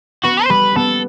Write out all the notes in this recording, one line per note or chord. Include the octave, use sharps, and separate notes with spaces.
B3 F#4
C5
G3 B4
B3 A4